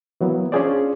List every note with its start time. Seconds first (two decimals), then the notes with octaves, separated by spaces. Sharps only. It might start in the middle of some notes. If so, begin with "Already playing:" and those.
0.21 E3 F#3 A#3 B3
0.52 C#4 D4 F4 G#4 C5 D5